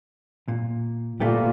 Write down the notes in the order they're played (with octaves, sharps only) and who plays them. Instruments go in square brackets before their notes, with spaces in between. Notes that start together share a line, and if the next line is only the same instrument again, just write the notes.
[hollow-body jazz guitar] A#2
[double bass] A#2 [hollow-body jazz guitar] A3 B3 G4